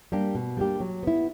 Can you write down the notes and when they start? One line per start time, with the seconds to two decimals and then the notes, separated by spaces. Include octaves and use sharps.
0.12 G3 A#3 D4 G4
0.35 B2
0.57 G3 A#3 D4 G4
0.80 F#3
1.03 B3 E4